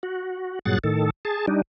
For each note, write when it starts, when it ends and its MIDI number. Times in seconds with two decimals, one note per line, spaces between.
0.03 0.59 66
0.66 0.78 43
0.66 0.78 46
0.66 0.78 54
0.66 0.78 68
0.66 0.78 78
0.66 0.78 93
0.84 1.10 45
0.84 1.10 51
0.84 1.10 69
1.25 1.46 68
1.25 1.46 81
1.48 1.62 55
1.48 1.62 62
1.48 1.62 63